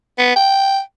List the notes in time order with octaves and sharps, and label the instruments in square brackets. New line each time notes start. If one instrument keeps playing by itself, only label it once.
[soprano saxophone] B3
G5